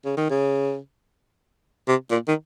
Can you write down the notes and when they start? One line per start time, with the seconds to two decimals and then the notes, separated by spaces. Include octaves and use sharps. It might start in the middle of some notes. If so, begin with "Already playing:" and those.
0.05 C#3
0.17 D#3
0.30 C#3
1.88 C3
2.11 A#2
2.28 D#3